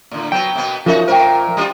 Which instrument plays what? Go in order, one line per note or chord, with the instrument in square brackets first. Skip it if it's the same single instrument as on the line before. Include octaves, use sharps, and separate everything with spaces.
[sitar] A2 D3
[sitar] F#3 B3 [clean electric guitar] G5 [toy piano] A5
[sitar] B2 A#3 B3
[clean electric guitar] F3 [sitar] C#4 D#4 F#4 [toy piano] F4 A#4 E5
[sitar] A#2 A3 A#4 [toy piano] C5 G5
[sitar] G3 B3 F4